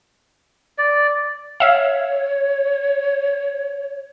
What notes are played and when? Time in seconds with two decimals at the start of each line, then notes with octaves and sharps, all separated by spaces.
0.78 D5
1.60 C#5 E5 F5